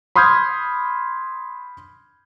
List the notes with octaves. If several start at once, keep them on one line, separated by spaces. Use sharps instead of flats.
B5 C6 D#6 F6 G6 G#6